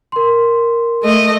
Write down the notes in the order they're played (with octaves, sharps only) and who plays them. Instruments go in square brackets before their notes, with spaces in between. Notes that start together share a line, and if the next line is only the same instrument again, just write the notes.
[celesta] A#4 C6
[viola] A3 D#5